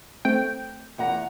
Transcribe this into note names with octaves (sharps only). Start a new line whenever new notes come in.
A3 C4 G5
E2 F#5 A#5